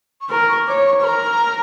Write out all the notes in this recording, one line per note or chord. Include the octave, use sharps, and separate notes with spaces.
C#6
A#4 A#5
C#6
C#5 D6
C#6
C#6
A#4 A#5